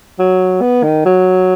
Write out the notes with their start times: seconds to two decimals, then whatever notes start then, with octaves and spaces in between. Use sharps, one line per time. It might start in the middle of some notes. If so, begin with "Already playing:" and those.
0.19 F#3
0.61 B3
0.83 D#3
1.06 F#3